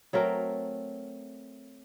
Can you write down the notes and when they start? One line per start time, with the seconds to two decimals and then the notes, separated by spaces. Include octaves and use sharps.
0.13 F#3 A3 C4 A#4